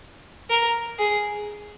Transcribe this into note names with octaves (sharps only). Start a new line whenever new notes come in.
A#4
G#4